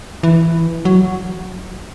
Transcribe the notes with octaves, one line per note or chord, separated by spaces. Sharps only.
E3
F#3